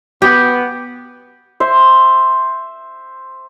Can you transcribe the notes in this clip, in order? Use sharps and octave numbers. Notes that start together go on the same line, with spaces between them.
B3 G4
C5 E5